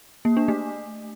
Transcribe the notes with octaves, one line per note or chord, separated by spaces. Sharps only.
A#3
D4
A3